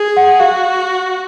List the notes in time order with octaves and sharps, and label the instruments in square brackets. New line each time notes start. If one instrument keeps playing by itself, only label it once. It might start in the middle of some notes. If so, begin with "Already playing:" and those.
Already playing: [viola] G#4
[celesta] F#5
[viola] F#4 [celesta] F5